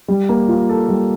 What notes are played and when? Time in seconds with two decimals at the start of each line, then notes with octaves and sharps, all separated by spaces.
0.08 G3
0.29 A#3
0.49 F4
0.69 A4
0.89 G3